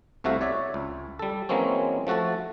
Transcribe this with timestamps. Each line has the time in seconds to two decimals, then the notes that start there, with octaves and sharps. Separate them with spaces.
0.24 C2 C3 A3 F#4 E5 F5
0.41 C#5 D5 E5
0.74 C#2
1.19 G3 A4
1.49 E3 F#3 G#3 A#3 C4 C#4
2.07 F3 A3 F#4 A4 A5